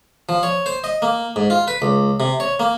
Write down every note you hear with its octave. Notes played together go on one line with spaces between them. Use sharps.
F3
C#5
C5
D#5
A#3
G#2
F4
B4
C#2
C3
C#5
A#3